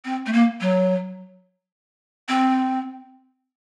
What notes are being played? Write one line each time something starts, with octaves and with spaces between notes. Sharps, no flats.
C4
A3
A#3
F#3
C4